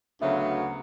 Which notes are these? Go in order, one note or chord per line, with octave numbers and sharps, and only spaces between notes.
D2 C#3 F#3 B3 E5
F#5